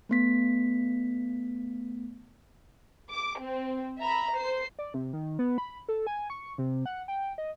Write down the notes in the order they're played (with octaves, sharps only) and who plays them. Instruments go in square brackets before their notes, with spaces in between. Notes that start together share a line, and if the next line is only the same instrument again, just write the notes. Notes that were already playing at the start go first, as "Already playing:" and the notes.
[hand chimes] A3 B3 B6
[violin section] D6
C4
E5 A#5 B5
C5 C7
[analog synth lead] D5
C3
D#3
B3
B5
A4
G#5
C#6
C3
F#5
G5
D#5